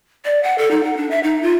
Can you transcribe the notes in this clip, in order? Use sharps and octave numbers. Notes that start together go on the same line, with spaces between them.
D5
F#5
A4
D#4
F#5
D4
E5
D#4
F4